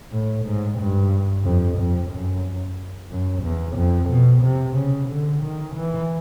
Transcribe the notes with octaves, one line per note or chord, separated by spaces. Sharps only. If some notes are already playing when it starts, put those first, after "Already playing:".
A2
G#2
G2
F2
F2
F#2
F#2
E2
F2
B2
C3
C#3
D3
D#3
E3